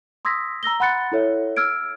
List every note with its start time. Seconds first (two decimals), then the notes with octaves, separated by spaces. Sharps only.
0.25 C6 D#6 E6 G#6 A#6 B6
0.63 A#5 E6 A#6 G7
0.80 F#5 B5 C6 F#6 A6 C#7
1.12 E4 A4 C#5 E5
1.57 E6 F6 G#6 D7